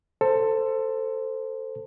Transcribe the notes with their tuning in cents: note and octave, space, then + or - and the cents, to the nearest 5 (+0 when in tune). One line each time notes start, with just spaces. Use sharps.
A4 +20 C5 +0